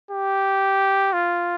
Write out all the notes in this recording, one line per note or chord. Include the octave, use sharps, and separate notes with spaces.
G4
F4